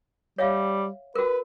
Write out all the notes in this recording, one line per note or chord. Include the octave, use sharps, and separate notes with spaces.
G3 C#5 E5 F5
F#4 A#4 B4